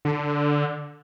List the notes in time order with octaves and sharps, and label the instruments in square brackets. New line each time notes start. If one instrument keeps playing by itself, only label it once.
[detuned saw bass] D3